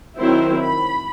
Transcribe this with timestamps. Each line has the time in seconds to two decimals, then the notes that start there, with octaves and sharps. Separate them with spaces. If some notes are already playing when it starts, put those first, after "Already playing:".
0.17 D#3 F#3 C4 E4 C5
0.61 B5